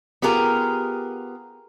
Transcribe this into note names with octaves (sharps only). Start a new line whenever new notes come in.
B3 F4 G4 G#4 A#4